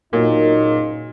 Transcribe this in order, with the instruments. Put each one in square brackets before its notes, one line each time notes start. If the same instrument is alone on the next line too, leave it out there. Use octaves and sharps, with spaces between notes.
[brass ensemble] F#1 D#4 [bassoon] F#2 [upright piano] A#2